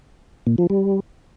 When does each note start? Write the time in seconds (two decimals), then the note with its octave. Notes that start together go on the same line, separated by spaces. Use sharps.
0.47 A#2
0.58 F3
0.70 G3